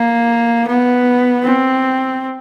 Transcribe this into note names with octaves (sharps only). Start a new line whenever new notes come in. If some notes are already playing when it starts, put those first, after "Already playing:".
Already playing: A#3
B3
C4